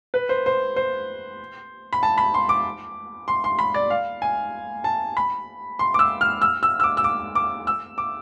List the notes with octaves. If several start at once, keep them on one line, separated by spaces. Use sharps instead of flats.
B4
C5
C5
C5
B5
A5
B5
C6
D6
C6
C6
B5
D5
F5
G#5
A5
B5
C6
D6
E6
F6
E6
E6
E6
D6
E6
D6
D6
E6
D6